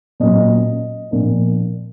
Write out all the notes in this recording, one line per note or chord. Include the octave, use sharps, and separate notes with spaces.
A#2 F#3 A#3 C#4 D#5
A#2 F3 A#3 D4